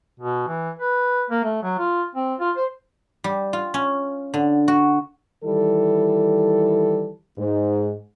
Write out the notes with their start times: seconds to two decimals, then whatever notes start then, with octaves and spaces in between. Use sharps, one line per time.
0.20 B2
0.47 E3
0.79 B4
1.30 A#3
1.44 A3
1.63 F#3
1.79 F4
2.15 C4
2.40 F4
2.57 C5
3.24 G3
3.53 F4
3.74 C#4
4.34 D3
4.68 F#4
5.44 D#3 E3 G3 E4 A4
7.38 G#2